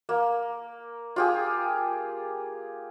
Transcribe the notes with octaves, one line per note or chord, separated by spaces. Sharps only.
A#3
F4 G4 G#4